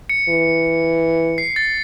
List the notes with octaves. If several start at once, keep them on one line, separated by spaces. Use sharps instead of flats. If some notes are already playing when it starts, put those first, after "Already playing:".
C#7
E3
C7
A6